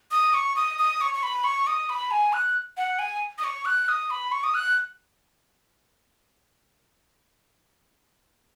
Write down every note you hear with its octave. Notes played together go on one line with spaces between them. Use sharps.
D#6
C#6
D#6
D#6
C#6
C#6
B5
C#6
D#6
B5
G#5
F#6
F#5
G#5
D#6
C#6
F#6
D#6
B5
C#6
D#6
F#6